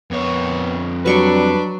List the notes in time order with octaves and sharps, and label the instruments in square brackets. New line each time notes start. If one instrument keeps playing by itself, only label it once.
[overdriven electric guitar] F2 C#5 [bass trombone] B3
[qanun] F#3 C#6 [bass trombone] G3 [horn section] D4 B4